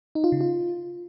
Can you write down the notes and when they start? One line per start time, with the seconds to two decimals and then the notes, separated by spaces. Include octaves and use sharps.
0.15 D#4
0.24 F4
0.32 C#3
0.41 F4